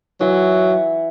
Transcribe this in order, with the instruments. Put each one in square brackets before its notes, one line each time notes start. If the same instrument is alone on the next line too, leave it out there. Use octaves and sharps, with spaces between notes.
[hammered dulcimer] E3 F#5 [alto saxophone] F#3